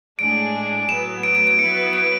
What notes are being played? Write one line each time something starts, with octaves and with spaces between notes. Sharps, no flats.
A2 G#3 D4 G#4 D7
A2 F#3 B3 E7
D7
D7
D7
F#3 B3 E4 B4 C#7
D7